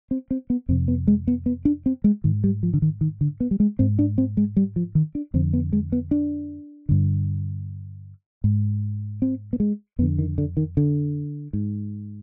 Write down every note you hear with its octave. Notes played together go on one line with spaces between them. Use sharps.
C4
C4
B3
F2 C3 C4
B3
G#3
B3
B3
D4
C4
G#3
G#2 D#3
G3
F3
D3
D#3
D#3
D3
B3
G3
G#3
G#2 C4
D4
C4
G#3
G3
F3
D#3
D4
F2 D3 C4
B3
G#3
B3
D4
G2 D3
G#2
C4
B3
G#3
F2 D3 B3
D#3
D3
D#3
D3
G#2